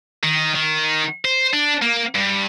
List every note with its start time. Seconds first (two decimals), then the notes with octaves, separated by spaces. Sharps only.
0.24 D#3
0.55 D#3
1.25 C5
1.53 D4
1.82 A#3
2.15 G2